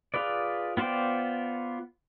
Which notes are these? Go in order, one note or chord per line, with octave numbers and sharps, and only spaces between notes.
F4 G#4 B4 D5
B3 F4 C5 D5 G5